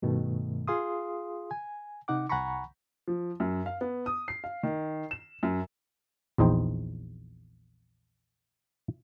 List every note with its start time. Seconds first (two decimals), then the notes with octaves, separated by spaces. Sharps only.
0.02 G2 B2 D#3 A3
0.68 F4 G#4 F5 C6 D#6
1.51 G#5
2.08 C3 D#4 F#5 D6
2.29 C2 F#5 G#5 A#5 B5 C#6
3.08 F3
3.40 F#2
3.66 F5
3.81 B3
4.06 D#6
4.28 C7
4.44 F5
4.63 D#3
5.11 E7
5.43 F#2
6.38 A#1 E2 D#4 C5 G5